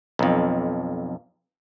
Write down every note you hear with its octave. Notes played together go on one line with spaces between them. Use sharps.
B1 F2